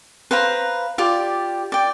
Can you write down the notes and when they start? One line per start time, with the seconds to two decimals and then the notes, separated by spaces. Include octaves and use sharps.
0.31 B4 C5 F5 A#5
0.98 F4 G4 D5
1.72 D5 G5